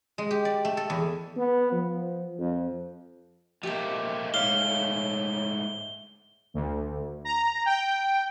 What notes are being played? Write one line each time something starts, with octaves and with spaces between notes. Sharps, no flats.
G#3
G4
D5
A3
A4
E2
B3
F3
F2
F3 A3 A#3 G4 C5 D#5
G#2 A3 C#5 F5 G7
D2
A#5
G5